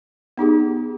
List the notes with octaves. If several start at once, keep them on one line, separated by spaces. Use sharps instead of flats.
B3 D#4 G4 G#4